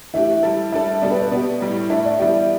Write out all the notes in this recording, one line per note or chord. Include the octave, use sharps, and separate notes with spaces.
E3 A3 D4 G4 E5
G3 E4 A4
G3 D4 A4 E5
B2 G3 D4 A4 D5
B4
D5
B2 B3 G4
A2 G3 E4
A2 A3 D4 A4 E5
D5
E3 G3 B3 G4 E5